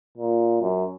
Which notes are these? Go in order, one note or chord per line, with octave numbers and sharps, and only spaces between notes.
A#2
F#2